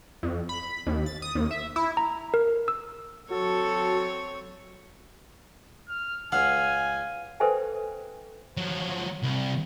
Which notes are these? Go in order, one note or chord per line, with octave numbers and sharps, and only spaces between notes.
F2
B5
D#2
A6
D#6
D#2
E5
E4
A#5
A#4
E6
F#3 C4 F#4 A4 C#5
F6
C#2 F5 F#5 G#5
A4 B4 C5 E5 G5 G#5
F3 F#3
C2